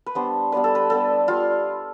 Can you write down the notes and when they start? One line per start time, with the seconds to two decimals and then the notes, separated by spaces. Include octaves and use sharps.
0.06 B4
0.15 G3 B3 D4 C5
0.52 G3 B3 D4 B4
0.64 A4
0.75 B4
0.90 G3 B3 D4 A4
1.27 G3 B3 D4 F4